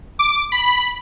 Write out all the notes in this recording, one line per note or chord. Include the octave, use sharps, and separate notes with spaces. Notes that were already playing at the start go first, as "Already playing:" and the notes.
D6
B5